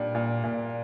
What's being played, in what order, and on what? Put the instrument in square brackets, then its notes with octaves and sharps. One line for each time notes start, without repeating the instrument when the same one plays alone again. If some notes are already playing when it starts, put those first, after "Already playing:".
Already playing: [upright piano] A#2 D4 [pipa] G3
[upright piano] A#2
A#2